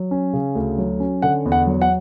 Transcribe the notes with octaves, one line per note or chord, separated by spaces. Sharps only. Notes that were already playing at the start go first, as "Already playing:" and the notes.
Already playing: F#3
C#4
C#3
D2
F#3
C#4
D3 F#5
E2
F#5
F#3
F#5